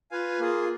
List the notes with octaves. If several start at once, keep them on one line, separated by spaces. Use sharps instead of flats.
F4 B4 F5 G#5
A#3 F4 G#4